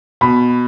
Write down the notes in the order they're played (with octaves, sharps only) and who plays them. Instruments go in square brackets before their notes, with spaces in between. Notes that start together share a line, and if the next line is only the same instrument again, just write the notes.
[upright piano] B2 [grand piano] B5